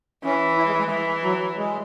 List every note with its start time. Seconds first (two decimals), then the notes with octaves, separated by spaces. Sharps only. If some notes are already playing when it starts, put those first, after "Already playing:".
0.24 E3 C#4
0.58 E4
0.68 G#3
0.79 G#3
0.90 E3
1.23 F#3
1.57 G#3